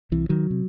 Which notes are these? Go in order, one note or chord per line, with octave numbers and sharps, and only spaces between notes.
C2 C3 E3
D#3 F#3
C3